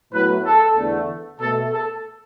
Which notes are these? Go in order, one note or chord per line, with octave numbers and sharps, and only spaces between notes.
A2 F#3 B3 B4
A4
E2 D3 A3
B2 A3 A4
A4